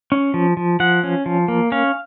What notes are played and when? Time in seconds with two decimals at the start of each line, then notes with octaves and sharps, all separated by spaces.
0.12 C#4
0.34 F3
0.57 F3
0.80 F3 F#5
1.04 C#4
1.26 F3
1.48 A#3
1.72 C#4 F5